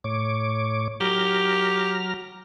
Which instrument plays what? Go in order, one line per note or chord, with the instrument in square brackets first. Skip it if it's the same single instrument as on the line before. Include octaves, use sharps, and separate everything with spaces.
[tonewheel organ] A2 C#5 D6
[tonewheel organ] F#3 A#5 F6 [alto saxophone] G4